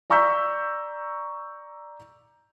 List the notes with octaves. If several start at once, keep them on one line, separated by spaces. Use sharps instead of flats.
D5 A#5 C#6 E6 G6 B6